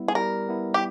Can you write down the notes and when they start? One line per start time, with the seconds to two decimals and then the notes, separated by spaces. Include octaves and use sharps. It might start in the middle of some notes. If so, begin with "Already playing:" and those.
Already playing: G3 B3 E4
0.08 G#4
0.15 G3 A#4
0.49 B3 E4
0.74 G4